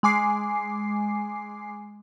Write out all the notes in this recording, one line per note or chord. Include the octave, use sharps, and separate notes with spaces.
G#3 G#5 D6 C7